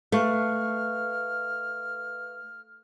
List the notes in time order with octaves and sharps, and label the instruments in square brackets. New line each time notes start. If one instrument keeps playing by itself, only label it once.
[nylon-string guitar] A3 [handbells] B4 F5 C#6 [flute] F6